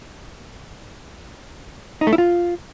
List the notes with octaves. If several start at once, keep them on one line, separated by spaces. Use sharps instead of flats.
D#4
A3
E4
F4